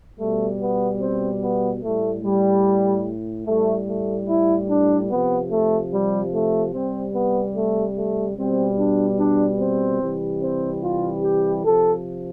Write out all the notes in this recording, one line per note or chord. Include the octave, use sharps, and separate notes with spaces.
B2 G3 A3
B3
C4
B3
A2 G3 A3
G3
A2 G3 A3
A3
E4
D4
C3 F3 B3
A3
G3
A3
C3 G3 C4
B3
A3
A3
B2 G3 C4
D4
D4
C4
C3 E3 G3
C4
F4
G4
C3 F3 A4